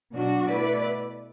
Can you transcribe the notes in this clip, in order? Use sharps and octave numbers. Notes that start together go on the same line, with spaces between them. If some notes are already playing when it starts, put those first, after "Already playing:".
B2 F#3 D4 F#4
B2 A3 E4 B4 D5